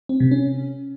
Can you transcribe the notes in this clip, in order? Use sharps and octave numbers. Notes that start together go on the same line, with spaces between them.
C4
C3
C#4